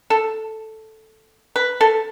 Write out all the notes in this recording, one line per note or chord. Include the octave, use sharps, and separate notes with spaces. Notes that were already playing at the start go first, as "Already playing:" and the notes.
A4
B4
A4